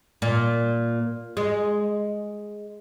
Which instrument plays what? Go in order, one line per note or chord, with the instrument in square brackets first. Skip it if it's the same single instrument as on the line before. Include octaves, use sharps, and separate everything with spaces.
[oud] A#2
G#3